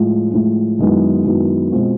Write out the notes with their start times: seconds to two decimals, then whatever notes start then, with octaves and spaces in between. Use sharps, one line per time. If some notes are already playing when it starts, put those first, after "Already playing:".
Already playing: A2 F3 G#3
0.32 A2 F3 G#3
0.79 F#2 D#3 G#3 B3 E4
1.25 F#2 D#3 G#3 B3 E4
1.72 B2 G#3 C4 F4